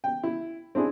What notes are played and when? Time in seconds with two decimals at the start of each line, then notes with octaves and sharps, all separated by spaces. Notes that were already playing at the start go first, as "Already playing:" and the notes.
0.04 G5
0.23 E4
0.75 C4 D4 E4 G#4